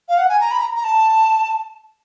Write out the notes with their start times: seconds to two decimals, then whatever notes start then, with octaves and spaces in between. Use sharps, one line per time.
0.09 F5
0.18 F#5
0.29 G#5
0.40 A#5
0.51 B5
0.59 A#5
0.75 A#5
0.84 A5